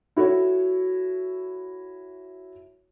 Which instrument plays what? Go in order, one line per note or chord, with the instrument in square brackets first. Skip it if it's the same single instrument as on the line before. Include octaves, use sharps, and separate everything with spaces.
[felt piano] E4 F#4 A4 C#5